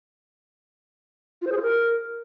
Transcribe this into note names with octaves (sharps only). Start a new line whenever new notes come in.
F4
C5
G#4
F4
A#4